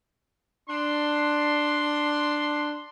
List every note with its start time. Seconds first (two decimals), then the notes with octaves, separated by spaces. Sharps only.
0.69 D4 C6